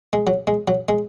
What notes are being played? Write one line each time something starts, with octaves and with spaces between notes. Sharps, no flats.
G#3
F#3
G#3
F#3
G#3